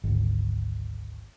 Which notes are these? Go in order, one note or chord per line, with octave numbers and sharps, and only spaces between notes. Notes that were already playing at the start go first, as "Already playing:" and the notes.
G#1 D2